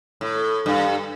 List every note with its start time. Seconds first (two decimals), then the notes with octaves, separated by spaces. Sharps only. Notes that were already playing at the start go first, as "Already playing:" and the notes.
0.21 A2
0.66 G2